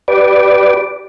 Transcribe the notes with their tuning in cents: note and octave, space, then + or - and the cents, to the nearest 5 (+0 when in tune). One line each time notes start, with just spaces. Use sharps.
G4 -25 B4 +0 D5 +0